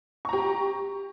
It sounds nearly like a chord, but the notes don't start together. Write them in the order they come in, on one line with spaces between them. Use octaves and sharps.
C#6 A#5 G4